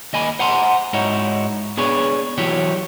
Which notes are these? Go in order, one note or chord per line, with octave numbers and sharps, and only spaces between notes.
D#2 D#5 G#5 B5
C5 F#5 G#5 A#5 C6
G#2 D#4 E4 F#4 C#5
B3 D4 G#4 B4 C#5
E3 F#3 E4 F#4 G4 C#5